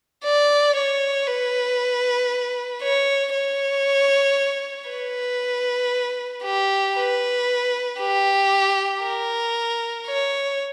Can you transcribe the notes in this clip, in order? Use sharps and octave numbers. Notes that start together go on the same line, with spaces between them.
D5
C#5
B4
C#5
C#5
B4
G4
B4
G4
A#4
C#5